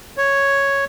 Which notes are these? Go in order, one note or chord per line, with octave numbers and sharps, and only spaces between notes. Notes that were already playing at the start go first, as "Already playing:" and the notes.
C#5